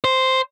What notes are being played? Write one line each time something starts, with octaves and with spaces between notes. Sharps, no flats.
C5